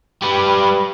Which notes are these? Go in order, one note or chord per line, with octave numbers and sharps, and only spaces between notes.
G3 B4